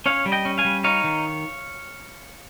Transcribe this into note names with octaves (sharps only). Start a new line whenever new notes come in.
C#4 C#5 F5
G3
D#5 G5
C#4
F5 G#5
G3
D#4 C#5 F5
D#3